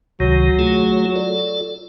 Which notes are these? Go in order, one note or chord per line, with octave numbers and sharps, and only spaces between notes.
C#2 C3 D#3 F#3
A3 F4 G#4
F4 A4 D5